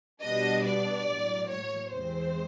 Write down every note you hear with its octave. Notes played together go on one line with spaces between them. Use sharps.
B2 G3 B3 D4 D#5
D5
A2 F#3 A#3
C#5
E2 C3 E3 G#3 C4 C5